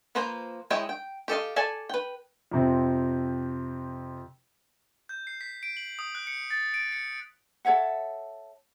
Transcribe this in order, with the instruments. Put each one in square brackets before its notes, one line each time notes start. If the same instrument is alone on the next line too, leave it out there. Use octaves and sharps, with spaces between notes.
[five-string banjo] F3 A#3 B4 C5 A#5
G#3 E4 C#5 D#5 G5
G5
G4 A4 D#5 F5
A4 D5 G#5 A5
B4 G5
[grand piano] F2 C3 C4
[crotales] G6
C7
B6
D7
F#7
D#6
F#6
C#7
A6
D7
C#7
[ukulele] A4 C#5 E5 F#5